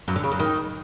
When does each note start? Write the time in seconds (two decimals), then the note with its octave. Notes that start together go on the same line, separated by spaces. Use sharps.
0.08 F#2
0.16 D3
0.24 C#3
0.32 F#2
0.39 D#3